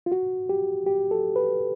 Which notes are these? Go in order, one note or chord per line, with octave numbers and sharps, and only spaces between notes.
F4
F#4
G4
G4
A4
B4